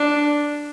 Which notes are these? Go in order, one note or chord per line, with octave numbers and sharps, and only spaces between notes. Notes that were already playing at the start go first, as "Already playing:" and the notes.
Already playing: D4